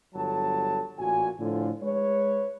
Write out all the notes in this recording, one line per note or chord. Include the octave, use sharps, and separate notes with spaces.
G1 F#3 A4 A5
A1 A#2 F#4 G#5
A2 D3 F3 D4 F4
G#3 B4 C#5